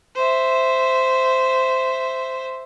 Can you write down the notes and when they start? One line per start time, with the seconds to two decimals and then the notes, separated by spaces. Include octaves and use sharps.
0.16 C5 E5